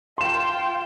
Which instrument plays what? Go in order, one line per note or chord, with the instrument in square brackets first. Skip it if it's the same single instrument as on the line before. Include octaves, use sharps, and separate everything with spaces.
[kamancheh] F4 G5 [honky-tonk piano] C6 E7